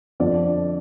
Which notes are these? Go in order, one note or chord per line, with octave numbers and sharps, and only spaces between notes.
F2 D3 F3 D5